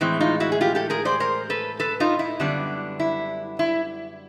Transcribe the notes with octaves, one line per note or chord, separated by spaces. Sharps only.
A2 E3 G#3 C4
D#4 F4
E4 F#4
G#4
F4 G4
G4 A4
G#4 A#4
C5 D5
A#4 C5
A4 B4
A4 B4
D#4 F4
E4
F#2 D3 G3 B3 D4
E4
E4